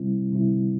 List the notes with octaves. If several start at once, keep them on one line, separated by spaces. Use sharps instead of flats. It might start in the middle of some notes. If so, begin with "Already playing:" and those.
Already playing: C3 G3 C4 E4
C3 G3 C4 E4